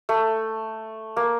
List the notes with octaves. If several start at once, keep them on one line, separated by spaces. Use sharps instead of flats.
A3
A#3